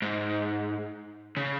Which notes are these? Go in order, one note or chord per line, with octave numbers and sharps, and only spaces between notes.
G#2
C#3